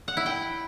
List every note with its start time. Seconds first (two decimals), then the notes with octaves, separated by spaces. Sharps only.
0.08 F#5
0.17 E4
0.26 G5